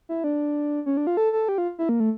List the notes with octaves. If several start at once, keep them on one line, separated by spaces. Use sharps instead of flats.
E4
D4
C#4
D4
F4
A4
A4
G4
F4
E4
A#3
A3